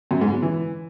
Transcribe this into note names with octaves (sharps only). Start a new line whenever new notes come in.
F#2
G#2
B2
E3